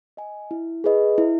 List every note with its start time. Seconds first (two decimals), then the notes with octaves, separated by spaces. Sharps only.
0.17 D#5 G#5
0.51 E4
0.84 G#4 B4 D#5
1.18 E4